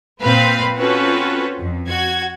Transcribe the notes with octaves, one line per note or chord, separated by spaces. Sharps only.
A#2 C4 B4 F5 B5
C4 C#4 F4 F#4 A4 B4
F2
F#4 G#6